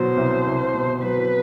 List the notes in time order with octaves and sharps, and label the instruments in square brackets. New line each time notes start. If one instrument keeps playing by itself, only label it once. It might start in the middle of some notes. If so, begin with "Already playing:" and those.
Already playing: [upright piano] B2 F#3 [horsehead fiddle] C5
[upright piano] C2
C2
B2
[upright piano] F#3 [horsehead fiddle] B4